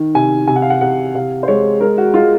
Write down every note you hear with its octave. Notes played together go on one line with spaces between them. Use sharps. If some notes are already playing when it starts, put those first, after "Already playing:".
Already playing: D#3
C3 G#5
C3 G#5
F#5
F5
F#5
C3 F#5
C3 F5
C5
G#3 C#5
G#3 A#4
F#4
G#3 F4